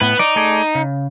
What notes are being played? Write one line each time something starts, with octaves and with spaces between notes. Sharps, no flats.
A2 B3 B4
D#4 D5
A3 G#4 D5
C#3